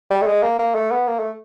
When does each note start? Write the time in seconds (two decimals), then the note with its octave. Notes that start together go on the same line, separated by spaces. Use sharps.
0.10 G3
0.22 A3
0.27 G#3
0.43 A#3
0.59 A#3
0.75 A3
0.91 B3
1.07 A#3
1.19 A3